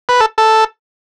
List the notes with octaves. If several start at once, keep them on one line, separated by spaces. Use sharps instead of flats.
B4
A4
A4